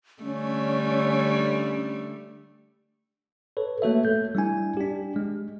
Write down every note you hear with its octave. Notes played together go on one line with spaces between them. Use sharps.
D3 G3 A3 C#4
A4 B4 C#5
A3 A#3 F#4 A4 C#5 E5
A3 G6
G3 D4 E4 G#5
D4 G4
G#3